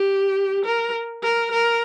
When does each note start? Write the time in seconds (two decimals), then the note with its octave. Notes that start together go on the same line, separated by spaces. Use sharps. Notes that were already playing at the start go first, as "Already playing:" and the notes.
Already playing: G4
0.66 A#4
1.23 A#4
1.52 A#4